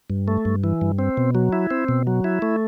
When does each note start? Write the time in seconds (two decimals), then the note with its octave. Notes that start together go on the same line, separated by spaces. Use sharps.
0.10 G2
0.28 A3
0.45 G2
0.64 E3
0.81 G2
0.99 C4
1.17 B2
1.35 F#3
1.53 E4
1.71 C4
1.88 B2
2.07 F#3
2.24 E4
2.42 A3